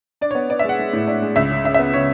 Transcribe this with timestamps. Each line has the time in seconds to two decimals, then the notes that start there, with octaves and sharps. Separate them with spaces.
0.21 D4 D5
0.31 C#5
0.35 B3
0.50 B3 D5
0.59 E5
0.64 G#3 F#5
0.79 G#3
0.93 A2
1.08 D4
1.22 G#3
1.36 C#2 E5
1.50 C#3
1.64 C#3 E5
1.74 E5
1.79 B3
1.93 C#3 C#5